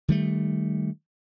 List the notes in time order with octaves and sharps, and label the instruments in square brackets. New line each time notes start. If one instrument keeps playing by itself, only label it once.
[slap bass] D#3 G3 A3